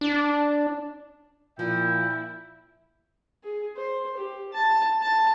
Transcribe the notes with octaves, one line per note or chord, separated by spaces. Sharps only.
D4
A#2 F3 E4 G5
G#4
C5
G4
A5
A5